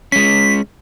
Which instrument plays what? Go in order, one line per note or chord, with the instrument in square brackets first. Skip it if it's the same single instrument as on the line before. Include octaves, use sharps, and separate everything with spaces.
[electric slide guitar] G#3 C#4 [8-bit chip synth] B6